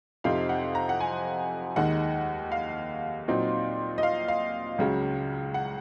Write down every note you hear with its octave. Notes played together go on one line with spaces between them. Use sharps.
F2 C3 F3 C4 D#4 F5
F#5
A#5
F#5
G#5
D#2 D#3 G#3 D#4 F#5
F5
A#2 F#3 C4 D#4
D#5
F5
F5
C#2 C#3 F#3
F#5